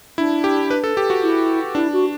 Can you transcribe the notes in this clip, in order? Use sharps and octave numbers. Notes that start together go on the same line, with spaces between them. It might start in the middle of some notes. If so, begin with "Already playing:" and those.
D4 E4
G4
B4
A4
G4
F#4
E4
D4 E4
F#4